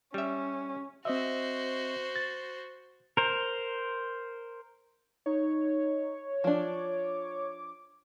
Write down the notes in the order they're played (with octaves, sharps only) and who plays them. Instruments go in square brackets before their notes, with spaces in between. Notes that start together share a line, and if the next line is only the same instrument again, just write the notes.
[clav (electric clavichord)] G3 E5 [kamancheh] C#4
[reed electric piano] C4 D#5 E5 [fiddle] F#4 C5
[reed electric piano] A6
[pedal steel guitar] A#4 C5
[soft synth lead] D#4 [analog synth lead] C#5
[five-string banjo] F3 D4 [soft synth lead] D6